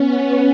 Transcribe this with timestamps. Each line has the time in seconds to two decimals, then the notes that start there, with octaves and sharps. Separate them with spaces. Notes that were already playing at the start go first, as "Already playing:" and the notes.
Already playing: B3 C#4